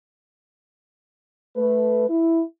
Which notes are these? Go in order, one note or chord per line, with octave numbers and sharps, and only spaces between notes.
A3 B4
E4